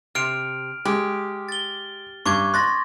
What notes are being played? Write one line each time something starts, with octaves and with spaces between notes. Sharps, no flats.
C3 F6 D7 F7
G#3 G4
A6 G7
G2 C#6 D6 G#6
C6 F#6 A6 A#6